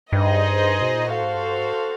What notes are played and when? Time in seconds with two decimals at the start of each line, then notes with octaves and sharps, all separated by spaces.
0.12 G2 D#4 G#4 C5 D#5
0.81 B2
0.94 A#2
1.09 A2 F#4 A4 C5 F5
1.22 G#2
1.35 G2
1.59 G#2